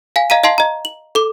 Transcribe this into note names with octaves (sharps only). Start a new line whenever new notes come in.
F5 G#5 B6
D#5 F5 A#5 B6 D#7
D#5 F5 A5 C6 C7 F#7
D#5 A#5
F#7
A4 D6